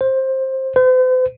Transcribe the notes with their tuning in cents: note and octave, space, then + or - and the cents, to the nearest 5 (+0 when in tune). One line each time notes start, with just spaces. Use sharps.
C5 +15
C5 -45